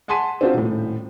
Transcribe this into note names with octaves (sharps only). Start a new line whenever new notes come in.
F#5 G#5 A5 C6 B6 D#7
C4 D4 F4 F#4 C5
D#1 A2